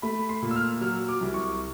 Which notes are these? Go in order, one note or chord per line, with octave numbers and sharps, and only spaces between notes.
A3 B5
C6
A#2
E6
F6
F#3 F6
D6
C2
C#6